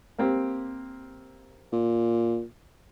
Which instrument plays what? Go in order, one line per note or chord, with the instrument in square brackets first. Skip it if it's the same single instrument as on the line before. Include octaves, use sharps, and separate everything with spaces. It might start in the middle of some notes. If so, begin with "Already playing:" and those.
[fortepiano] A#3 C4 G4
[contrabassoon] A#2